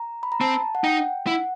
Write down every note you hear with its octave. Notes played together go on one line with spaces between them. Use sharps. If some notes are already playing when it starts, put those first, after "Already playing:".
Already playing: A#5
B5
A#5
C4 A5
F#5
D#4 G5
E4 F#5